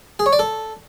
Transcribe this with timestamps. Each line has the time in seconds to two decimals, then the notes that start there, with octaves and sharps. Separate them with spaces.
0.19 G#4
0.26 C#5
0.33 D5
0.39 A4